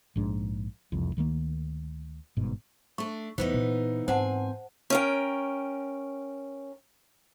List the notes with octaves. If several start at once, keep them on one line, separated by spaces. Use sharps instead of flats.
A#1 G#2 D4
E1 C2 F2
D2 D#3 G3 A#3
G1 G#2 B2
A3 D4 C#6
E2 E3 A3 B3 D#4 C5
A#2
G#2 C4 C5 F#5 G#5 A5
C#4 A#4 G5